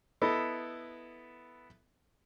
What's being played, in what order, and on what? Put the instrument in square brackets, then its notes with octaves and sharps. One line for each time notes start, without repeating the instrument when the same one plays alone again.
[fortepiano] B3 E4 A4 D#5